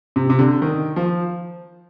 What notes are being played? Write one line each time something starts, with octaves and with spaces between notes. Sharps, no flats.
C3
C3
D3
D#3
F3